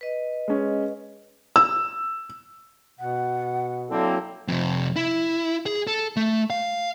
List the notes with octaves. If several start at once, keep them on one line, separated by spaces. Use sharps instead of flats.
B4 D#5
G#3 C#4
E6
B2 F#5
D3 F#3 A#3 C4 E4 A4
F2 C3
E4
G#4
A4
A3
F5